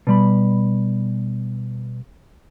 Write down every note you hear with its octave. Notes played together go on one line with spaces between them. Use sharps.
B2 G3 B5